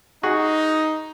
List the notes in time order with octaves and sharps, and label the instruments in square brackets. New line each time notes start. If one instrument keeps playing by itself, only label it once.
[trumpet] D#4 [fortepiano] F#4 G#4